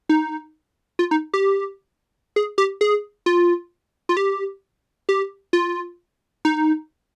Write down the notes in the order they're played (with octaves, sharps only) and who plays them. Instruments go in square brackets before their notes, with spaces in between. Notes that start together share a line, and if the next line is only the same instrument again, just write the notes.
[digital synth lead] D#4
F4
D#4
G4
G#4
G4
G#4
F4
F4
G4
G4
F4
D#4